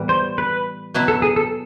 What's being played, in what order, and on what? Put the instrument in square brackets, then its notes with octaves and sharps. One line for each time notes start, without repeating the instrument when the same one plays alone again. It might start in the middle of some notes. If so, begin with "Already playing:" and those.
Already playing: [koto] A2 E3 G3 B3
[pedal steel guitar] C5
B4
[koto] B2 F#3 B3 E4
[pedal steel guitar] A4
G#4
A4